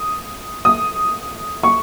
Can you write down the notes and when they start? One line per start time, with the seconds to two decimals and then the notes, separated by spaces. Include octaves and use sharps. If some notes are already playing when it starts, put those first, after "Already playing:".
Already playing: D#6
0.65 D#6
1.63 C#6